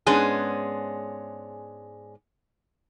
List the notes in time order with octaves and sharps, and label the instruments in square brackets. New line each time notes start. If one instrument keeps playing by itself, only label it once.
[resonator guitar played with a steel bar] G#2 G#3 B3 C#4 D4 G#4